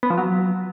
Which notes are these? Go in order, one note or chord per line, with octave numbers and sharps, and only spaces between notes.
B3
F3
F#3